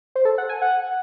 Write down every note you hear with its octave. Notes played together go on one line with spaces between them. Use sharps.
C5
A4
F#5
G#5
F#5